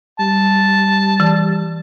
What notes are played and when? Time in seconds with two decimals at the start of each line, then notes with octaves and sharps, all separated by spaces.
0.20 G3 A5
1.20 E3